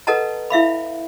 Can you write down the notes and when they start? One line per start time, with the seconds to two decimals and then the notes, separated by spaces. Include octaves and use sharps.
0.07 A4 B4 D#5 F#5 A5 A#5
0.50 E4 E5 F5 B5